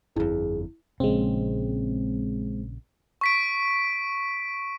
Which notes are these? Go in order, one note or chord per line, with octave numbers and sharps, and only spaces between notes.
G1 F2 E4 G#4
A#1 C#3 G#3 C4
C#6 B6 D7